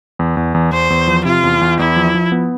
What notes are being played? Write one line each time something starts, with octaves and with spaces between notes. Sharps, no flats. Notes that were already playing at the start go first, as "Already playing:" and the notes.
E2
E2
E2
E2 C5
E2
F3
C3 F4
E2
E2
E2 E4
F3
F3
B3